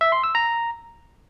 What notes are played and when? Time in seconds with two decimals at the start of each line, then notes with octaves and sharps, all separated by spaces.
0.01 E5
0.12 C6
0.24 E6
0.35 A#5